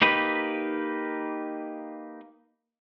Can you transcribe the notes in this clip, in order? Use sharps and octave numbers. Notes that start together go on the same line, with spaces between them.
A#3 D#4 G4 B4